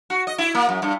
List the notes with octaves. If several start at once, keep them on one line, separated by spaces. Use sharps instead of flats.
F#4
D#5
E4
A#3
F#2
G2